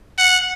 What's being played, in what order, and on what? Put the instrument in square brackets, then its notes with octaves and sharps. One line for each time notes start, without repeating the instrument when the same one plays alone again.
[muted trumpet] F#5